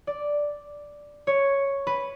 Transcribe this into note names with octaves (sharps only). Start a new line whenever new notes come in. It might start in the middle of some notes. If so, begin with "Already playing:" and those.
D5
C#5
B4